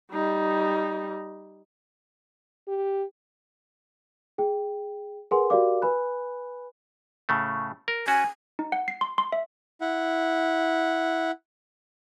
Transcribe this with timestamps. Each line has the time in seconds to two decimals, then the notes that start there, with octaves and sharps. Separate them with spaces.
0.12 G3 D#4
2.68 G4
4.38 G#4 G5
5.31 G#4 A#4 B4 F#5 G#5 C6
5.50 F#4 G4 A#4 D5 F5 D6
5.82 B4 G#5 B5 F#6
7.29 A2 C#3 A3
7.88 A#4
8.08 C#4 F#4 G#5
8.59 D#4
8.72 F#5
8.88 C7
9.01 C6
9.18 C6
9.32 E5
9.81 E4 F#5